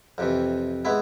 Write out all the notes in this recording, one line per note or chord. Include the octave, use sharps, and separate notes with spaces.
F2 C3 E3
G#3 B3 E4